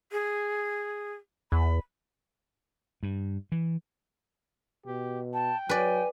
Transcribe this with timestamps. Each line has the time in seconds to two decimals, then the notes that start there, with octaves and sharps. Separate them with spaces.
0.12 G#4
1.52 E2 B5
3.03 G2
3.52 E3
4.86 B2 G4
5.34 G5 A5
5.69 F#3 B4 D5 G#5